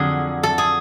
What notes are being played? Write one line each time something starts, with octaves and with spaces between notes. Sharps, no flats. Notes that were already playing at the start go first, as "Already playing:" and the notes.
Already playing: F2 D3 F#3 G#4
A4
G#4